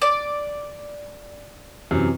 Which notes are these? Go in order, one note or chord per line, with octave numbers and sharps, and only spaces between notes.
D5
F#2 C3 E3